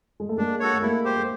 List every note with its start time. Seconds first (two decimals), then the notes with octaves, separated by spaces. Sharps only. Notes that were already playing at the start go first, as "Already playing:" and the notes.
0.20 G#3
0.29 A3
0.38 G#3 A#3 D4
0.60 F#4 A4 C#5
0.73 A3
0.82 G#3 A#3 E4
1.05 G4 C5
1.16 G#3